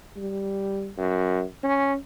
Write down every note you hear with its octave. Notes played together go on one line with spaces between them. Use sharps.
G3
F#2
C#4